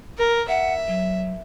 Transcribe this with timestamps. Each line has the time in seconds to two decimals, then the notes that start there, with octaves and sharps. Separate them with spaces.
0.18 A#4
0.49 E5 F#5
0.87 F#3